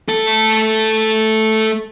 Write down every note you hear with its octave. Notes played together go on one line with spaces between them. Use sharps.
A3 A4